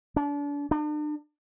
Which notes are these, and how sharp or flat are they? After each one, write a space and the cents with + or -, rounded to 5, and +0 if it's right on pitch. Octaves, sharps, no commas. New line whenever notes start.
D4 -35
D4 +40